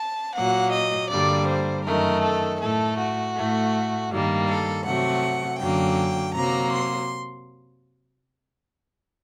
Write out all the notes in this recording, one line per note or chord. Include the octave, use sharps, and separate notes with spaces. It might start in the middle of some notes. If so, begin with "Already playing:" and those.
Already playing: A5
A#2 F#3 A#3 F#5
D#5
G2 D3 G3 A#3 D5
C5
F#2 D#3 A3 A#4
A4
A2 A3 A4
F#4
A2 A3
G2 D#3 G3 A#3
A4
C3 F#3 A3 F#5
F#2 D3 F#3 A#3 G5
C3 F#3 A#3 A#5
C6